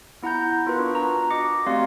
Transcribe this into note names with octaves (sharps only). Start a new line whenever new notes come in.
B3 E4 F#5 A#5 G6
B3 F4 F#4 A#4 B4
D4 C#6
A#5
F#4 D#5 D6 A#6 C#7
A3 C4 G4 D5 F5 C6